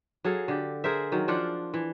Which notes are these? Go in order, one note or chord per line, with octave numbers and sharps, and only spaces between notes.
F#3 G#4 A4 F5
D3 G4
G#4 A#4 C5 E5
D#3 F#3
F3 D4 F4 F#5
E3